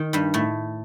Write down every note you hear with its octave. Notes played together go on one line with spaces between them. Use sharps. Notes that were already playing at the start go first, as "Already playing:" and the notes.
Already playing: D#3
G2 G3
A2 A3